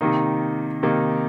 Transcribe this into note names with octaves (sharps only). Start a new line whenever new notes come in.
C3 D#3 A#3 D#4
C3 D#3 A#3 D#4